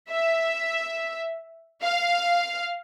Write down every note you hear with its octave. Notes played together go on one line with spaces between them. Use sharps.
E5
F5